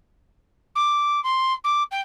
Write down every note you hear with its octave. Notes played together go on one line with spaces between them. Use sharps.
D6
C6
D6
G5